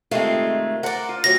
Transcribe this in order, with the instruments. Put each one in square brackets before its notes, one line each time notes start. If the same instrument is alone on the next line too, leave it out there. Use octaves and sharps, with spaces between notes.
[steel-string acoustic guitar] C3 D#3 A3 [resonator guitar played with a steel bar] G#3 C4 F4
[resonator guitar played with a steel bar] A#4 F#5 [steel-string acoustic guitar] C5 D5
[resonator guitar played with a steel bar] F4
[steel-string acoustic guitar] D2 F#3 G3 [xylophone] A#6